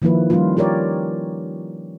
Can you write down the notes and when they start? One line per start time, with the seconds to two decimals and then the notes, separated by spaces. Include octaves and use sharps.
0.02 D#3 F3 A#3 E4 B4
0.30 F3 G3 A#3 C#4 D#4 F4
0.57 F4 G4 A#4 C#5 D5